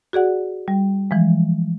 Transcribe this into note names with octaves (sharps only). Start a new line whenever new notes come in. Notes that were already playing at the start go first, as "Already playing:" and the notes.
F#4 G#4 D5 F#5
G3
E3 F3 G#3